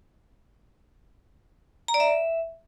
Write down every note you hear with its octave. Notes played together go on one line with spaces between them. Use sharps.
A#5
D5
E5